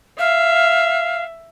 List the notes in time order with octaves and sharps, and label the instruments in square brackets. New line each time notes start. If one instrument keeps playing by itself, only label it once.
[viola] E5 [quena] F5